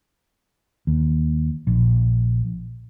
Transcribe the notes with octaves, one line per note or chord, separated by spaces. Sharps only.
D#2
A#1